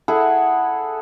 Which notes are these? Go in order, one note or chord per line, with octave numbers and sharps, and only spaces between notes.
E4 G#4 A4 F#5